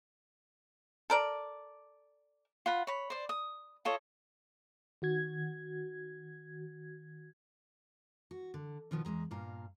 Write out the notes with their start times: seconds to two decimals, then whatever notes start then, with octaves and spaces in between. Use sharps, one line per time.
1.10 A4 A#4 D5
2.66 F4 F#5 B5
2.87 C#5 B5
3.10 C5 D5
3.29 D#6
3.85 F4 A4 C#5 D#5
5.02 D#3 F#4 G#6
8.31 F#4
8.54 D3
8.91 B2 D#3 F3 B3
9.05 E2 G#2 G#3 A#5
9.31 G2 A#2 F5 A#5